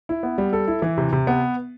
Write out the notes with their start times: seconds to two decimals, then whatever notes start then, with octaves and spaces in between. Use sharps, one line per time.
0.09 E4
0.23 B3
0.38 G3
0.53 A4
0.68 E4
0.82 E3
0.98 C3
1.12 C3
1.27 B3